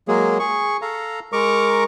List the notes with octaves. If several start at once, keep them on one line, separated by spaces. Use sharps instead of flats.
F#3 G#3 A#3 G#4
G#4 C#6
A4 F5 A#5
G#3 A#4 A#5 C#6 D6